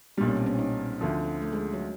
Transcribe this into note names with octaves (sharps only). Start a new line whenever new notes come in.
B1 A#2 G3 D4
C#4
C4
B3 C#4
C#4 D#4
D2 D3 F3
A3
G#3
F#3